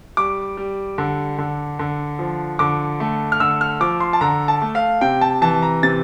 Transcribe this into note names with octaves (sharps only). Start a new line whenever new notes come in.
G3 D6
G3
D3
D3
D3
F3
D3 D6
A3
F6
D3 E6
F6
F3 D6
C6
A5
D3 A#5
A5
A3
F5
C3 G5
A5
E3 A5
A#5
C3 A6